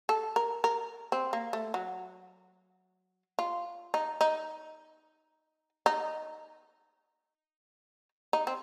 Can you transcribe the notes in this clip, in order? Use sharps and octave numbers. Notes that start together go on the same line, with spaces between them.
A4
A#4
A#4
C4
A#3
A3
F#3
F4
D#4
D#4
D#4
D#4
C4